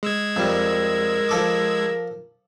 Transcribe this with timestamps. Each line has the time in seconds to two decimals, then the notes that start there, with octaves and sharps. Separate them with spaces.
0.03 G#3 E6 G#6
0.36 F2 G3 A#4
1.29 F3 A4 D6